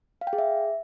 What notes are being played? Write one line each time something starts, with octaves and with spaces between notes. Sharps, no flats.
F5
G5
G#4
E5